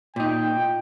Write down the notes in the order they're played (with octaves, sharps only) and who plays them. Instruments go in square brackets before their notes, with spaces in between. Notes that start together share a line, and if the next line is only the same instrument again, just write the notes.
[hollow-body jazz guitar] A#2 D#4 [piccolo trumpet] G5